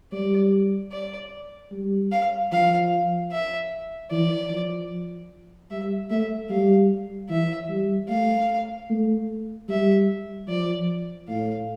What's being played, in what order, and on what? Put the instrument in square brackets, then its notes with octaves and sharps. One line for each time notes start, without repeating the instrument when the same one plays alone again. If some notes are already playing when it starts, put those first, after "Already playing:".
[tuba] G3 [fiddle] D5
[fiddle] D5
[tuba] G3
[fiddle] F5
[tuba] F3 [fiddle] F5
[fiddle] E5
[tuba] E3 [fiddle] D5
[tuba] F3
[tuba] G3 [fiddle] E5
[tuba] A3 [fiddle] E5
[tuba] G3 [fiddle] F5
[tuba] E3 [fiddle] E5
[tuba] G3
[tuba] A3 [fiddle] F5
[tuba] A3
[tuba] G3 [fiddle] E5
[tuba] F3 [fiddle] D5
[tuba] A2 [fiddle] F5